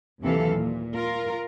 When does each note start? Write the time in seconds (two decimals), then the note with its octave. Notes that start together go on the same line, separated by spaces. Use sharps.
0.22 D#2 C3 E3 F#3 A4 F5
0.54 A#2
0.94 F4 A#4